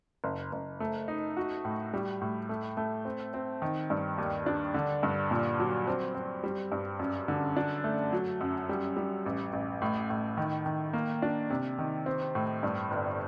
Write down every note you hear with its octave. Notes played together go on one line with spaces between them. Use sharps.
F#1
F#1
A3
D#4
F#4
A2
G3
A2
A3
A3
C4
C4
D#3
G2
D#2
D4
D3
G2
A#2
F#3
C4
C4
G3
G2
F#2
D3
D4
A3
F#3
F#2
G3
G3
A1
A1
A2
A2
D#3
D#3
A#3
D4
C3
D#3
C4
A2
G2
G1